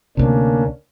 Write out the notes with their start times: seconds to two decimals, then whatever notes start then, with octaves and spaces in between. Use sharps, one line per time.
0.17 D2 C3 A#3 C#4 D4